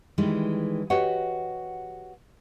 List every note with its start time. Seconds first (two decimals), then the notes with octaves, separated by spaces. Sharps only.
0.18 D#3 E3 G3 G#3
0.90 F#4 G4 B4 C#5 D#5 F#5